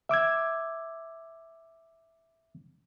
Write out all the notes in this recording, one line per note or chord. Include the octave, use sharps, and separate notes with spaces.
E5 D6 E6 G#6